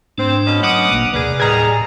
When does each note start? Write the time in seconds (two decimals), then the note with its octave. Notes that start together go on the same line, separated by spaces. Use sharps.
0.18 G#2 A3 C4 D4
0.47 B2 C#4 D#5
0.63 F#3 F#5 D6 D#6
0.92 G#1 A#2 A#3
1.14 D#2 C3 G#4 A#4 B4 D5
1.40 A2 D#3 G3 G#4 A#5